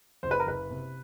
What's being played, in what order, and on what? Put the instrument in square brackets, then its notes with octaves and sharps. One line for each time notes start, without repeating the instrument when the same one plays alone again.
[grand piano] F#1 C5
B4
A#4
F#1 B4
C3